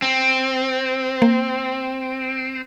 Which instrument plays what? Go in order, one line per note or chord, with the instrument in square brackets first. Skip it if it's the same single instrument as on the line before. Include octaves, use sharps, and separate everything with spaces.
[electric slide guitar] C4
[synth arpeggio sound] A#3